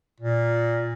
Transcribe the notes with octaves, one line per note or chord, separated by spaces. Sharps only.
A#2